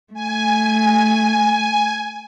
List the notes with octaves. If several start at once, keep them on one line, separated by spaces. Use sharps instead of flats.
A3 G#5